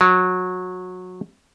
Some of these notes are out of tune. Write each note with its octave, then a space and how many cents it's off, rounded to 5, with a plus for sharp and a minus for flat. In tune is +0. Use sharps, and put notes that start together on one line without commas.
F#3 -20